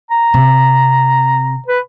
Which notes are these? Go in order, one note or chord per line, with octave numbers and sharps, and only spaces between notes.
A#5
C3
B4